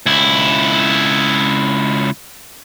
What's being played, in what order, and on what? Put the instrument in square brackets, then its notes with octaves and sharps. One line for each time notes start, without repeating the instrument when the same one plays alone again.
[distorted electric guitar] C#2 E4